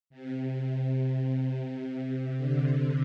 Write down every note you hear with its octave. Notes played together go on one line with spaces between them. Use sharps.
C3
D3